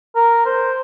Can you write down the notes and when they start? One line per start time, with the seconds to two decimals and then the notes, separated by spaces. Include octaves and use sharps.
0.15 A#4
0.46 C5